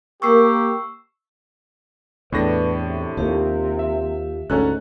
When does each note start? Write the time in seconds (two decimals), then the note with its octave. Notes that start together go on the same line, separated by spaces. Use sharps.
0.22 A#3 G4 C#6 E6 C7
2.32 E2 A2 D4 B4 A#6
2.78 C3
3.17 D#2 F4 G4 F5
3.79 E5
4.50 D2 G#2 C#4 A4 A#5 F#6